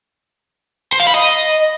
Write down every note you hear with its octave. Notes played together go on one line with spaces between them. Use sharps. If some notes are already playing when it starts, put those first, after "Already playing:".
C5
F5
B5
D#5